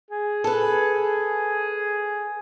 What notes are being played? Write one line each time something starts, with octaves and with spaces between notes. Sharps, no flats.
G#4
A4 B4